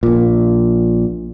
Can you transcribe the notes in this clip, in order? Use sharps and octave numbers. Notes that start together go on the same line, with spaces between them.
A#1 A#2